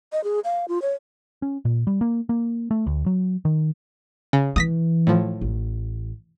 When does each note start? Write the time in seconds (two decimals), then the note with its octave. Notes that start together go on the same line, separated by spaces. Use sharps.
0.12 D#5
0.24 G#4
0.44 F5
0.68 F4
0.82 C#5
1.42 C#4
1.65 A#2
1.87 G3
2.01 A#3
2.29 A#3
2.71 A3
2.87 D2
3.06 F#3
3.45 D#3
4.33 C#3
4.56 E3 D#6 A#6 B6
5.07 A2 F3
5.41 A1